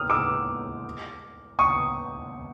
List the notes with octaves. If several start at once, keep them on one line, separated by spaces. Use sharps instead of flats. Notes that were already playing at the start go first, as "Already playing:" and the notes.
Already playing: D#6 F6
D6 E6
C#6 D#6